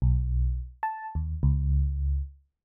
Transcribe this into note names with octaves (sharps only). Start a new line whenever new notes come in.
B1
A5
D#2
C#2